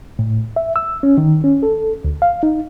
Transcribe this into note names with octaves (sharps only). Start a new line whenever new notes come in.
A2
E5
E6
C#4
D#3
C#4
A4
D2
F5
D#4